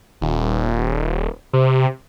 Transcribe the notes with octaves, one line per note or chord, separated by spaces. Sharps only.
D#1
C3